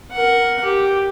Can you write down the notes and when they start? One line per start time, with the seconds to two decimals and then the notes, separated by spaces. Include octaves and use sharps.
0.11 A#4 F#5
0.64 G4